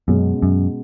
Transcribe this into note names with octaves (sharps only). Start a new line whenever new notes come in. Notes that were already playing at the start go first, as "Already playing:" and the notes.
F#2 B2 G#3 C#4
F#2